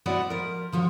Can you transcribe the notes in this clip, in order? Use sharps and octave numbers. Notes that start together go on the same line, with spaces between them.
B3 E4 F#4 C5 D5 D#5
F3 A#4
D3 F3 F#4 C#5